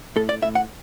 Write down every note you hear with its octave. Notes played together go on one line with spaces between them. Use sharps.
A2 A4
D5
A2 E5
F#5